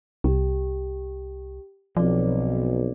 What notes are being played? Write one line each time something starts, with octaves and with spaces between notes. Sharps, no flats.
C2 G4
B1 F3 C4 D5